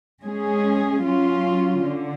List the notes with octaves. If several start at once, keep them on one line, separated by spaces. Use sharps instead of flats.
G#3 C#4 G#4
F#3 C#4 F4
D3